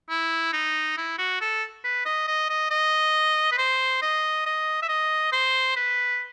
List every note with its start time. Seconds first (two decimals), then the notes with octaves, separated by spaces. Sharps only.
0.10 E4
0.53 D#4
0.97 E4
1.18 F#4
1.41 A4
1.84 B4
2.05 D#5
2.27 D#5
2.49 D#5
2.71 D#5
3.52 B4
3.58 C5
4.02 D#5
4.46 D#5
4.82 E5
4.88 D#5
5.32 C5
5.76 B4